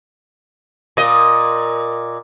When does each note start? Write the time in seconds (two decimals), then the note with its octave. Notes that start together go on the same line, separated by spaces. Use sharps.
0.97 A#2 D#5